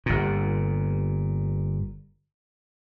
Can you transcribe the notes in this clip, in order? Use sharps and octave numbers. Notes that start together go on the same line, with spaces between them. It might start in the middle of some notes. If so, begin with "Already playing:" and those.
G1 A#2